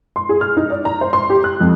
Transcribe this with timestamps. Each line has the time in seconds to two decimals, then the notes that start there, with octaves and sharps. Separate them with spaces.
0.16 C6
0.29 G#4
0.41 F6
0.57 D#4
0.70 D5
0.85 A#5
1.01 C5
1.13 C6
1.30 G4
1.44 F#6
1.61 F2